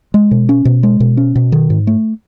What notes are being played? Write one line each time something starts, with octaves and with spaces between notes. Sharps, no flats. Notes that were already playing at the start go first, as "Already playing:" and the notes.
G#3
B2
C#4
B2
G#3
B2
C#4
B2
D#3
G#2
A3